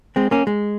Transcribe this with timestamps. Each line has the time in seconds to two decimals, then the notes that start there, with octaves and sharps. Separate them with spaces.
0.16 G#3 C4
0.31 A#3 C#4
0.47 G#3